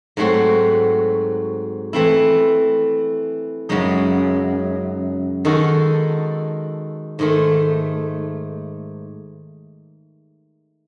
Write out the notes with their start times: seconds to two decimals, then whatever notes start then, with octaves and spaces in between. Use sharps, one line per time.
0.17 G#2 F#3 A3 C4 F#4
1.93 E3 A3 C4 E4
3.69 F#2 C#3 G#3 D#4
5.45 D#3 G#3 D#4 F#4 A4
7.19 G#2 D#3 A3